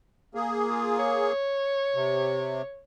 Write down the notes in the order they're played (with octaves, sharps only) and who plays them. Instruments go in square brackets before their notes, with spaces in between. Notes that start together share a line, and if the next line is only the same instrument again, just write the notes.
[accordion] A#3 G#4
[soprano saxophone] F4
C#5
[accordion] C3